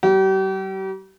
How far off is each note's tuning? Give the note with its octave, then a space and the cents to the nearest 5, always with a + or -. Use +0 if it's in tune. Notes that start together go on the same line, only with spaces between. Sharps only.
G3 -40 G4 -40